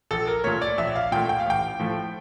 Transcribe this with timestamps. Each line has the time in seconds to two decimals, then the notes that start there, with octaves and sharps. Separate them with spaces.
0.11 A#1 A4
0.27 A#4
0.44 A#2 A3 C#5
0.62 D5
0.78 A#1 E5
0.95 F5
1.12 A#2 A3 G5
1.29 G5
1.40 F5
1.46 A1 G5
1.79 A2 F3 A3